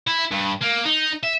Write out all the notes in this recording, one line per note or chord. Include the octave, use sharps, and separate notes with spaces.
E4
G2
A#3
D#4
E5